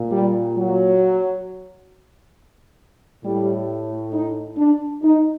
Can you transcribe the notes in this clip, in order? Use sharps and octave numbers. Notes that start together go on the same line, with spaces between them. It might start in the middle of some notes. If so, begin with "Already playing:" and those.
Already playing: A#2
G3
F#3
A2 G3
D#4
D4
D#4